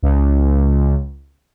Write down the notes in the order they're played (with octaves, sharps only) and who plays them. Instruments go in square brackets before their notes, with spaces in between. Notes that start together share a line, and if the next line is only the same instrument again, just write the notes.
[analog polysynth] C#2